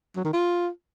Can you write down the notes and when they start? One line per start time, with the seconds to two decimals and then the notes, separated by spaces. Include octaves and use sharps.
0.16 F#3
0.25 D#3
0.33 F4